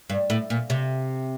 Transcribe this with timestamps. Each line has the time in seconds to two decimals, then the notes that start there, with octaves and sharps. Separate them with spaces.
0.10 G2
0.30 A2
0.50 A#2
0.70 C3